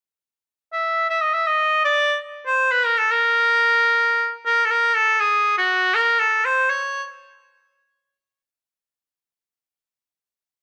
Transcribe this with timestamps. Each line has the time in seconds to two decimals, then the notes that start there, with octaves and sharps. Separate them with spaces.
0.73 E5
1.10 E5
1.22 D#5
1.34 E5
1.47 D#5
1.85 D5
2.46 C5
2.72 B4
2.85 A#4
2.98 A4
3.11 A#4
4.46 A#4
4.66 A4
4.71 A#4
4.95 A4
5.20 G#4
5.58 F#4
5.95 A#4
6.20 A4
6.45 C5
6.70 C#5